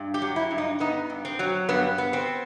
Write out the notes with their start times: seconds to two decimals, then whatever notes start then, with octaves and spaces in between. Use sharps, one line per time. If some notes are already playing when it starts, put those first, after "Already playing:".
Already playing: G2
0.14 G4
0.22 F#3
0.36 E4
0.51 G2
0.58 D#4
0.80 B3 D#4
1.10 G2
1.25 C4
1.39 F#3
1.69 G2 B3
1.98 B3
2.13 C4